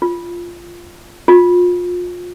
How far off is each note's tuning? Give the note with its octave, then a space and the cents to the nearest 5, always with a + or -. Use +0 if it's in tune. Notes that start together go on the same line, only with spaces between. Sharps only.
F4 -10
F4 +25